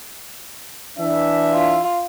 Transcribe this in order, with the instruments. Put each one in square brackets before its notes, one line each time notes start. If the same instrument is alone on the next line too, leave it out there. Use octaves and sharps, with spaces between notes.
[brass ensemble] E3 D4 E5
[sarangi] F4